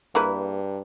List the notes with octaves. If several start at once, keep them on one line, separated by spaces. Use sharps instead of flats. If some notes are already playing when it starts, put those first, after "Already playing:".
G2 A#3 E4 G#4 B4 F5 A#5